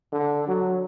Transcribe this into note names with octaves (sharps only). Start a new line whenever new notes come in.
D3
F#3